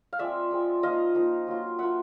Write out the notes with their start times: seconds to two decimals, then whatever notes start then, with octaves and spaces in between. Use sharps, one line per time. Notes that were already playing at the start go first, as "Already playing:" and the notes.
0.13 F5
0.19 F3 G#3 C4 D5 E5
0.51 F3 G#3 C4
0.83 F3 A#3 D#4 D#5 F5
1.15 F3 A#3 D#4
1.47 F#3 A#3 D4 F4
1.78 F#3 A#3 D4 F4 E5 F#5